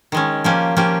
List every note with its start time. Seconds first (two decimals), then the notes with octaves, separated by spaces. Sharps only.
0.12 D#3 G#3 C#4
0.44 F3 A#3 C#4 G4
0.77 F3 A#3 C#4 G4